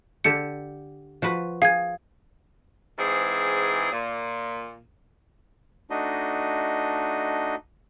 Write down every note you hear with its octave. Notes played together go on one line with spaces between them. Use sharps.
D3 G4 A4 C#7
F3 F#4 B4
G#4 F5 G#6
G#2 E3 C4 G#4
A#2
A3 D4 D#4 F#4 D#5